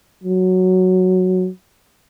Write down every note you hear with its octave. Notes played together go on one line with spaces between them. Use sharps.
F#3